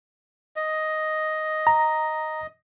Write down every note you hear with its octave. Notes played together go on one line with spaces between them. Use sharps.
D#5
A#5